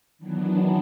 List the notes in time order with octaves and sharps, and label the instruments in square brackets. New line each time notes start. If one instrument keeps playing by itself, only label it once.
[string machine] D#3 E3 F#3 B3 D4